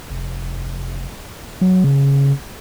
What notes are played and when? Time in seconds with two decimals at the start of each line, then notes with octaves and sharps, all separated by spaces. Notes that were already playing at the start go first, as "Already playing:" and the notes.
0.10 F1
1.61 F#3
1.84 C#3